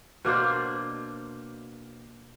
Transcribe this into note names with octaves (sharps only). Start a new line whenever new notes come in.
B2 A#3 D4 C5